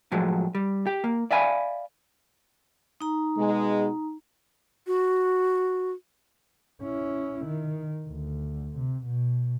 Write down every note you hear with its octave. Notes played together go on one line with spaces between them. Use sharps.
A2 F3 F#3 G#3
G3
G4
A#3
D5 E5 F5 G#5 B5
D#4 A#5
B2 G#3
F#4
C#4 E4
D#3
D2
C3
B2